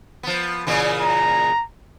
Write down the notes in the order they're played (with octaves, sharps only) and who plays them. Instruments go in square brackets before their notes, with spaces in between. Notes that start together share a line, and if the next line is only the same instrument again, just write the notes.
[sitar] F3 B3
A#2 C#3 E3
[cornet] A#5